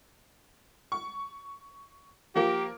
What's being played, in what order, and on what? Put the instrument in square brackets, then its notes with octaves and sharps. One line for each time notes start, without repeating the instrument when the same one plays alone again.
[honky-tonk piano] C#6
[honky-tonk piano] F3 A#3 A#4 [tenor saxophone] G4